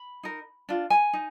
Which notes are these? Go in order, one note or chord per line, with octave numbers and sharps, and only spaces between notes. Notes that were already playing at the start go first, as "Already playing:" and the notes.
Already playing: B5
D#4 A#4
D4 F4
G#5
D#4